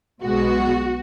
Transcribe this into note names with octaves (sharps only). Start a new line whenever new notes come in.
B1 B2 G#3 B3 F#4